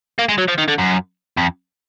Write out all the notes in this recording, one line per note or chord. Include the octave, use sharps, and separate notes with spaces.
A#3
G#3
F#3
F3
D#3
D3
F#2
F2